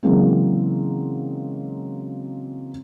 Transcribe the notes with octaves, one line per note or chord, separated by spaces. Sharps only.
C#3 E3 F#3 G#3 A#3 C4